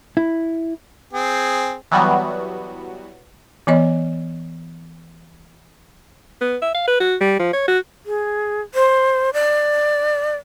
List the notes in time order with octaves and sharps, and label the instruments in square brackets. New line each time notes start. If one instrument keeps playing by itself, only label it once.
[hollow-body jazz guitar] E4
[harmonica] C4 G#4
[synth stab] E3 F#3 G3 B3 F#4
[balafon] E3 B3 C#5 D#5
[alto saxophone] B3
E5
F5
B4
F#4
G3
F3
C#5
F#4
[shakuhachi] G#4
C5
D5